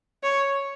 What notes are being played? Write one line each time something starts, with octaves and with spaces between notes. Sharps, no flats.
C#5